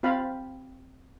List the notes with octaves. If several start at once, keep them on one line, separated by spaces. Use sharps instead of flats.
C4 F4 F5 B5